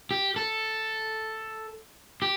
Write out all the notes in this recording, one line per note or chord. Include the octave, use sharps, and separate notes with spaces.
G4
A4
G4